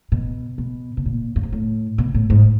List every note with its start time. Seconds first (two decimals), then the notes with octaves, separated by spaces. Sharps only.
0.12 B2
0.58 B2
0.97 B2
1.06 A#2
1.36 G2
1.43 G#2
1.53 A2
1.98 B2
2.15 A2
2.30 G#2